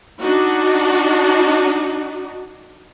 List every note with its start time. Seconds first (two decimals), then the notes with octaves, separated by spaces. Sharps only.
0.22 D4 D#4 F#4